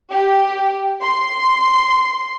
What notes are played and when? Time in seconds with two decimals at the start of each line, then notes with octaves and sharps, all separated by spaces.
0.12 G4
1.03 C6